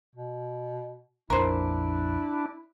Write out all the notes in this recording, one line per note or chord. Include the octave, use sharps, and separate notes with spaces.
B2
A#1 F2 D4 E4 A#4 C5